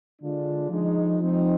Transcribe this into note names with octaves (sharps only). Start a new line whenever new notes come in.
D3 G#3 D4 F4
F3 G#3 D#4
F3 C4 D#4